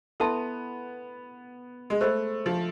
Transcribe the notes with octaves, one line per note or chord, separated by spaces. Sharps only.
B3 E4 A4 E5 A5 C6
G#3
A3 C5 E5 B5
F3